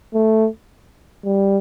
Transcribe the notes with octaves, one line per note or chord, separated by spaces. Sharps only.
A3
G3